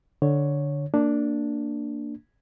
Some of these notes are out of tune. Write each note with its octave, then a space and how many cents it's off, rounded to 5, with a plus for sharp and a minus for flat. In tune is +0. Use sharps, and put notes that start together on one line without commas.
D3 +0 C#5 +0
A#3 -20 D4 +0